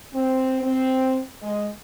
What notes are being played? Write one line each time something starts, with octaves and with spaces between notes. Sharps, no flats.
C4
C4
G#3